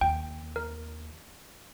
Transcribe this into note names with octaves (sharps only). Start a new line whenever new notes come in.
D#2 G5
A#4